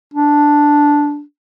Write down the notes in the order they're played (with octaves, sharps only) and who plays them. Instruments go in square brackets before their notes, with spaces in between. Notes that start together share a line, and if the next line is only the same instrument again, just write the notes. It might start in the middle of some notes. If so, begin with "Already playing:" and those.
[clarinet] D4